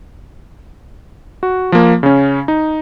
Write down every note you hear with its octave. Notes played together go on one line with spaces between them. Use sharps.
F#4
F3 A#3
C#3 C#4
D#4